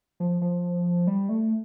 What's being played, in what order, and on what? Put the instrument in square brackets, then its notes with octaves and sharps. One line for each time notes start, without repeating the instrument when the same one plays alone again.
[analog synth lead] F3
F3
G3
A3